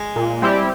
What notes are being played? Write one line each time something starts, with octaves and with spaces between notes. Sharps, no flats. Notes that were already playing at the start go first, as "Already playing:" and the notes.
Already playing: G#3
A#2
G3 C4 E4 G4